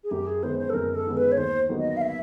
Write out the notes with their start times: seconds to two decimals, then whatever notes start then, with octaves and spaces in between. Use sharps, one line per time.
0.04 G#4
0.11 F#2 G4
0.27 G#4
0.43 D#3 G#3 B3 C5
0.59 C5
0.69 A4
0.74 F#2 A#4
0.95 A4
1.06 D#3 G#3 B3
1.17 B4
1.31 C#5
1.37 D#2 C5
1.69 D#3 F#3 B3 D#4
1.79 D#5
1.97 F5
2.01 E5